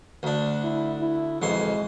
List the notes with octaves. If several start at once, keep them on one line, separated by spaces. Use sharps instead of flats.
D2 D4
E4
E4
B1 F2 G#3 C6